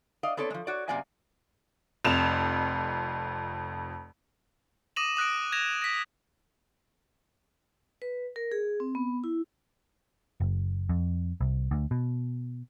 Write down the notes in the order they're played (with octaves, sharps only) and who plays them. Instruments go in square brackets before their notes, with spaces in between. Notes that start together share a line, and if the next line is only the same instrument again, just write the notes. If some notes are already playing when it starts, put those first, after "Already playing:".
[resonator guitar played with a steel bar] D5 D#5 F5
B3 C4 A4 C#5 D5
F3 G#3
F#4 C#5 D5
F#2 C3 A#3 D5 F5 G#5
[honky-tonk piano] F1 F2 E7 F7
[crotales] D6 D#6 A#6 D#7 E7 F#7
D#6 F#6 A#6 D7
G#6 A#6 E7 F7
A#6 B6
[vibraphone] B4
A#4
G#4
C4
B3
E4
[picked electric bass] F#1
F2
C2
D2
B2